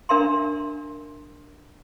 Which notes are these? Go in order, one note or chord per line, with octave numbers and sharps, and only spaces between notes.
D4 A#4 E5 A#5 C6